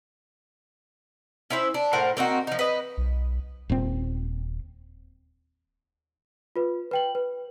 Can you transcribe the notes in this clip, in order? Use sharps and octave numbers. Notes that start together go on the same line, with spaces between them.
C#4 E4 C5 E5
D4
A2 A#4 C5 F#5
A#3 C4 D#4 F#4
F3 D#4
B4 D#5
B1
D#1 A#2 C4
F4 B4
B4 G5 F#7
B4